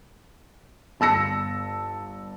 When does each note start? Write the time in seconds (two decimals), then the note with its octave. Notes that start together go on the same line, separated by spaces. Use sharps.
1.00 G1 A5 E6 A#6 C#7